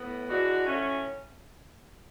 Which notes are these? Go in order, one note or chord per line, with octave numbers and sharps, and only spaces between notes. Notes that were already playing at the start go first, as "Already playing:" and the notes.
Already playing: A2 B3
E3 G#3 D4 F#4
A2 F#3 A3 C#4